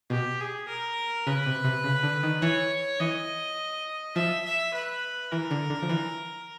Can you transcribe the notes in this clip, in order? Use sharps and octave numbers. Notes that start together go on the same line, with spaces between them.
B2 G4
G#4
A#4
C#3 B4
C3
C3
C#3
D3
D#3
E3 C#5
E3 D#5
F3 E5
E5
B4
E3 A#4
D3
D3
F3
E3